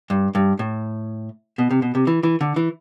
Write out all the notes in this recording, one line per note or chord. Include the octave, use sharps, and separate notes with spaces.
G2
G2
A2
B2
C3
B2
C3
E3
E3
D3
E3